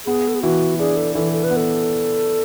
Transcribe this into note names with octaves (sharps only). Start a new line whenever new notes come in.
B3 G#4
A4
G#4
E3 F#4
D4 G#4
A4
E3 A4
A4
B4
B3
A4